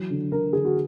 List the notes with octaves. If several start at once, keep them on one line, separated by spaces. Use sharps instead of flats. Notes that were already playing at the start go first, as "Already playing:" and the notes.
Already playing: E3 F#3
D3
D3 A#4
D3 G#4
F#4